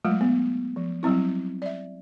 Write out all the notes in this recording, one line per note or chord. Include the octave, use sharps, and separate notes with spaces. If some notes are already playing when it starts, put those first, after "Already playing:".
F#3 G#3 A3 F4
B3
F3
F#3 G3 C4 E4
D5 E5